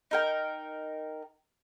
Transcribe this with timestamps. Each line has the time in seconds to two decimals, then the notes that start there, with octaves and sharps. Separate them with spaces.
0.11 D#4 A#4 G5